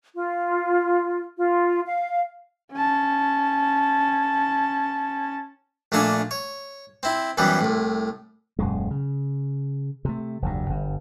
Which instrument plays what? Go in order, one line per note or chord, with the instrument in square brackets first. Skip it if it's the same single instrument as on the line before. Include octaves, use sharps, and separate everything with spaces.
[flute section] F4
F4
F5
[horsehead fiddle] C#4 A5
[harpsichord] A#1 A3 A#3 D4 A4 G#5
C#5
C4 E4
F#2 E3 F#3 G3 B3
C2 A2
[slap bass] D#1 F#2 G#3
C#3
C3 A3
F1 D2 G2
G1 G2